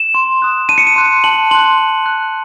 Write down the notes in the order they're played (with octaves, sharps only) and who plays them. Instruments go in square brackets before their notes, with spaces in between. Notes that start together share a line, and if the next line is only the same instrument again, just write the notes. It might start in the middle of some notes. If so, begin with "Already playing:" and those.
Already playing: [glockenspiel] E7
C6
D#6 F#6
A5 D#7
C#7
D#7
C6 F#6
A5 F#7
C6 F#6 F#7
C6
F#6